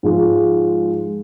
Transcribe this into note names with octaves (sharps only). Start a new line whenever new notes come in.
G#2 F3 G#3